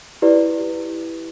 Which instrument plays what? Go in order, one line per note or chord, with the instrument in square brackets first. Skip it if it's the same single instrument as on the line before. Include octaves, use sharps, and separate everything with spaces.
[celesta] E4 G4 B4 D5